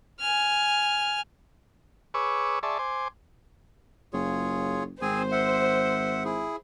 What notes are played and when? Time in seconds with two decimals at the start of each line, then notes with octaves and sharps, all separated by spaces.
0.20 G#5 F6
2.14 G#4 B4 C#5 C#6 D6 E6
2.63 G#4 D5 E5 A5 C6 C#6
2.79 C5 G#5 C6 D6
4.13 F#1 F4 G#4 C#5
5.01 G#1 C4 G#4 C5 G#5
5.31 E5 F#5
6.25 E4 G#4